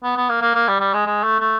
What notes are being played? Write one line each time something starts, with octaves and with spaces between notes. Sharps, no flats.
B3
B3
A#3
A#3
A#3
G3
G3
G#3
G#3
A3
A3